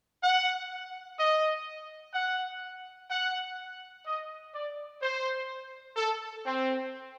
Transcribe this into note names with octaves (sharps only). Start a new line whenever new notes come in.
F#5
D#5
F#5
F#5
D#5
D5
C5
A4
C4